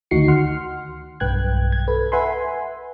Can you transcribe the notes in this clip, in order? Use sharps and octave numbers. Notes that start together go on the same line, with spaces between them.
D2 D#3 D#4 F#4 C7 C#7
F#5 C6 F6
B1 G2 B4 G5 F#6 G#6
G#6
A4 B4
B4 E5 F#5 G#5 B5 C6